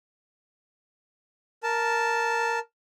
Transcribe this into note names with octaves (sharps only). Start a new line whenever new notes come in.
A#4 A5